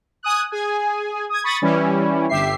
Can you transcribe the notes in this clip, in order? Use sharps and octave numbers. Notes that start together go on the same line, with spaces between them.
G#5 D#6 F#6
G#4 G#5
D#6 G#6
B5 C#6 D#6 A6
E3 G3 C#4 E4
G1 G4 E5 C7